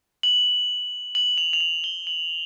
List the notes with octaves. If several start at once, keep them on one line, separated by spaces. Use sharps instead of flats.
F#7
F#7
F7
F7
F#7
G7
F#7